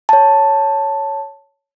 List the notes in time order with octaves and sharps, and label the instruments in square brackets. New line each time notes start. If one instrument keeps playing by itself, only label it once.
[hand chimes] C#5 A5